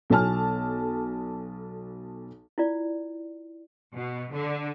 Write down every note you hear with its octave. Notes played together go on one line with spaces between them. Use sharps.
B1 A4 G#5 A5 F6
E4 F4 D5
B2
D3